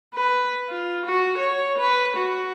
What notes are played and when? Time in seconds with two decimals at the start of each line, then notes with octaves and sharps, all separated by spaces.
0.14 B4
0.69 F4
1.06 F#4
1.38 C#5
1.78 B4
2.17 F#4